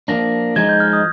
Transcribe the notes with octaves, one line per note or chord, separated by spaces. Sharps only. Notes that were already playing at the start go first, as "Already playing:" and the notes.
F3 A#3 D4 A#6
F3 G#3 D#4 G#6
G6
F6
D#6